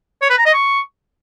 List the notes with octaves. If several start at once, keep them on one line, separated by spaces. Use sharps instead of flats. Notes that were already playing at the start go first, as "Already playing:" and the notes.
C#5
B4
A#5
D#5
C#6